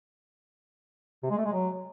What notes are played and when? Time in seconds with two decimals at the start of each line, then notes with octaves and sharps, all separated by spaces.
1.23 C3
1.30 G#3
1.38 A3
1.45 G#3
1.53 F#3